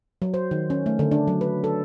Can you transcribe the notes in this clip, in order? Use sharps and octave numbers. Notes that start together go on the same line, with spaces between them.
F#3
C5
D#3
C#4
A3
D3
D4
F#3
B4
A4